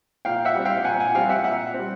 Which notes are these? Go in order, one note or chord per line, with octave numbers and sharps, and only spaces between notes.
A#2 F5 G5
E5 F#5
G3 C4
F5 G5
G5
A#2 F#5 G#5
F#5 G#5
G3 C4 F5 G5
E5 F#5
A#2 E5 F#5
C4
G3